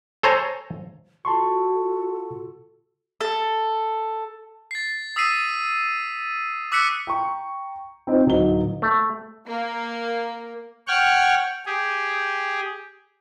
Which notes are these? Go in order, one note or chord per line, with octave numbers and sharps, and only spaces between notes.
A4 C5 C#5 G#5 A#5
F4 F#4 A4 A5 C6 C#6
A4
A6 C7
D#6 E6 B6 C7 D#7
D6 E6 F#6 B6 C#7 D#7
G5 A#5 C#6
C4 D#4 F4 C5
D1 F#3 D#4 G7
A3
A#3
C#5 F#5 G5 C#6 F6 F#6
G4 G#4